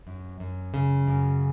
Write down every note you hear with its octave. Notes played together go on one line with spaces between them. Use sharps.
F#2
F#2
C#3
F#2